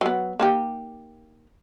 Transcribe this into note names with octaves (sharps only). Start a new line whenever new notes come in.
F#3 B3
A#3 D#4 G4